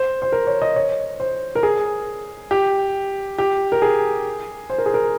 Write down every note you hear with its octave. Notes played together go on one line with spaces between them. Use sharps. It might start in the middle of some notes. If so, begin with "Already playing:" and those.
Already playing: C5
C5
A#4
C#5
D#5
C#5
C5
A#4
G#4
G4
G4
A#4
G#4
C5
A#4
G#4
A#4